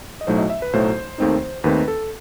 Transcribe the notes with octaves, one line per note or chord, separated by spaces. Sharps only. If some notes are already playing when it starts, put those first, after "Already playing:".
D#5
B1 A2 F#3 A3 D#4 C5
D#5
E5
B4
B1 A2 F#3 A3 D#4 C5
D#2 D#3 A3 C4 D#4
D#2 D#3 A3 C4 D#4 B4
A4